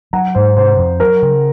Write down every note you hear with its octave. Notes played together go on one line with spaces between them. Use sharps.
F#3 F#5 A#5
G#2 C5
C3 C5
F2
F#3 A#4
C#3